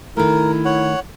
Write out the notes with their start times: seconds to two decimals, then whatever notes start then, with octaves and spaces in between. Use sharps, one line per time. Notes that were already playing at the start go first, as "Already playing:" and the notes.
0.17 D#3 A3 E4 A#4
0.65 C#5 F#5